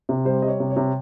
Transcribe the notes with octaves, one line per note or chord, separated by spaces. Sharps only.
C3
G3 C5
G3 D#5
C#5
C3
C#5
C3